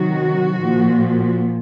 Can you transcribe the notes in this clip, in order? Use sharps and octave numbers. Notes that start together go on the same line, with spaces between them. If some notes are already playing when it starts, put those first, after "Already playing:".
Already playing: C3 D#3 F#3 F#4
A#2 F3